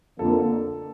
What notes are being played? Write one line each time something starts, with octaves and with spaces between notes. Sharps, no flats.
F2 D3 F3 A#3 A4